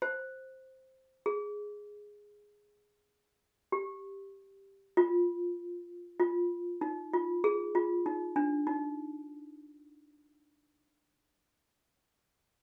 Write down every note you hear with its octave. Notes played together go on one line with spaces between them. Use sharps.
C5
G#4
G4
F4
F4
D#4
F4
G#4
F4
D#4
D4
D#4